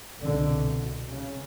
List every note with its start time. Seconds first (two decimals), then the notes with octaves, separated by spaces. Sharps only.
0.20 C2 B2 D3
1.08 C#3